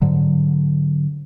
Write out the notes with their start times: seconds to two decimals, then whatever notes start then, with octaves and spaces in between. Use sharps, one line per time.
0.02 G#2 D3 F#3